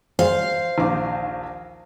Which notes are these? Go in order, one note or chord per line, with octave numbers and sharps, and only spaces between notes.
C5 F5
A#1 D#2 D6